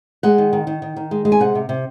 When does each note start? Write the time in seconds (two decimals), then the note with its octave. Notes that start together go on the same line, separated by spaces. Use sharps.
0.23 G#3 F#5
0.38 D#3
0.53 D#3
0.67 D#3
0.82 D#3
0.96 D#3
1.11 G#3
1.25 G#3
1.32 G#5
1.40 C3 F#5
1.55 C3
1.69 C3